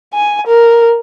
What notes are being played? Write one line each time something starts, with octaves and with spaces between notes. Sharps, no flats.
G#5
A#4